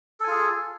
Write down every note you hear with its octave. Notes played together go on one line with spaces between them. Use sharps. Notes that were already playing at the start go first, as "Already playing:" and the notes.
F4 G#4 A4 G#5